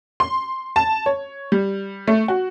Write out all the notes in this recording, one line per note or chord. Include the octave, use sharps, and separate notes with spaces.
C6
A5
C#5
G3
A3
F#4